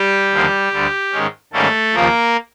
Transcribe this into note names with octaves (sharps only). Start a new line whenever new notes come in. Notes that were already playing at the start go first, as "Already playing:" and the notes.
Already playing: G3 G4
D#2 D3 F3 A#3
D2 D3 G3
G#2 D#3 G#3 C#4
G#2 D#3 G3 A3 A#3 C#4 A4
D#2 C#3 F3 A#3 A#4